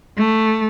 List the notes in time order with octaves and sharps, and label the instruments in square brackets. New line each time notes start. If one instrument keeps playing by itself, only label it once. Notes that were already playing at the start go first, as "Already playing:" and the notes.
[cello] A3